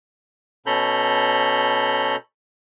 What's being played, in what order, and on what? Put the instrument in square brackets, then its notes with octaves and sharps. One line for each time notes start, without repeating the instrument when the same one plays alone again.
[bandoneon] B2 C#4 A4 A#5 B5 G6